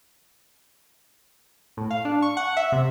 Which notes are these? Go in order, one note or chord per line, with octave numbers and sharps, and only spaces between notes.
A2
F5
D4
C#6
F#5
E5
C3